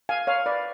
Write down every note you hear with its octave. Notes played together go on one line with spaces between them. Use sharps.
F5 G#5
C#5 F5
B4 D5